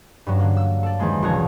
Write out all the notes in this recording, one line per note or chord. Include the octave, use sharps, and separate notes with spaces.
G2 F#3
D3 A#3
E6
A4 D5
E2 D#3 F3 G#3 A#3
E1 A#1 B2 F#4 A#4 C#5